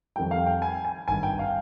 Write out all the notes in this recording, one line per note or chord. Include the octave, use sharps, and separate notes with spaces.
F2 D#3 G3 G5
F5
G5
G#5
G#5
G#1 G2 D#3 G#5
G5
F5